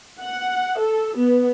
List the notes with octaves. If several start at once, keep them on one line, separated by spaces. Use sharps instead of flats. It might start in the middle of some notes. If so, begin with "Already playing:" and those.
F#5
A4
B3